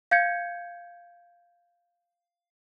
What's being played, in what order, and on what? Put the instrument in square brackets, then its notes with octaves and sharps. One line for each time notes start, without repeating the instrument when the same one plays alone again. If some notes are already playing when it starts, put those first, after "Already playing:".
[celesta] F5 G6 G#6 C#7